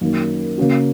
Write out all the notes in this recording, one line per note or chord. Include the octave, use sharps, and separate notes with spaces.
F#2 D#3 A#3
C#3 A#3 C#4 F#4